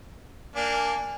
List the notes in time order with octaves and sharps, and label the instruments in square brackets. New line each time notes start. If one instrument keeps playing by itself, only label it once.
[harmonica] A#3 D4 [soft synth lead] G#5